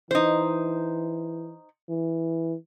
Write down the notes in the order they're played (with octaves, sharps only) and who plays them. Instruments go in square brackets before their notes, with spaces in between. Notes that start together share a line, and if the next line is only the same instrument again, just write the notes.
[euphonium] E3 [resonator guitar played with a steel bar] D#4 C5
[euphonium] E3